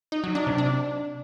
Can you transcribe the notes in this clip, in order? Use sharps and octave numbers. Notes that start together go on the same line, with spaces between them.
D#4
F#3
D4
C3
D4